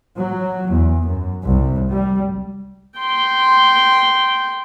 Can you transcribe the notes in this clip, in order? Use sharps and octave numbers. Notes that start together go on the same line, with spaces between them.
F#3
E2
F#2
C2
G3
G5 C6